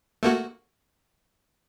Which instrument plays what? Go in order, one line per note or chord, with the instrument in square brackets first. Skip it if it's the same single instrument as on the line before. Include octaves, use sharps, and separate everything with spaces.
[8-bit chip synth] A3 A#3 F#4